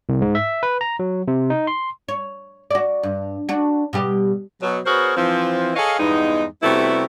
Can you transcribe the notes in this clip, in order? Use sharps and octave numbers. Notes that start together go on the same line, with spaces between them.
C2
G#2
E5
B4
A#5
F#3
C3
D#4
C6
C#5
F#4 D5
G2
D4 F#4
B2 G3 G4
B2 F#3
B3 F#4 G#4 A#4 C5 C#5
E3 F3 C4
G#4 A4 C#5 D#5 F5
E2 G2 G#3 B3 D#4
C3 G3 A3 B3 E4 F#4